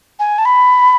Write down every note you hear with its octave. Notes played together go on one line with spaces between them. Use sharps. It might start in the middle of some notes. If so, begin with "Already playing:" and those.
G#5
A5
B5